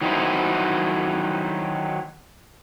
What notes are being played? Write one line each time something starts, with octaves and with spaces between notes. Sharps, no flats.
D#3 F#3 D#4 E4 C5